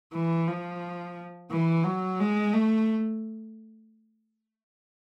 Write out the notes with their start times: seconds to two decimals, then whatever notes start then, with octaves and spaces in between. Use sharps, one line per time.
0.13 E3
0.48 F3
1.51 E3
1.84 F#3
2.19 G#3
2.53 A3